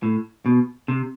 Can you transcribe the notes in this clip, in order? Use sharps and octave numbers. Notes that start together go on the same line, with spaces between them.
A2
B2
C3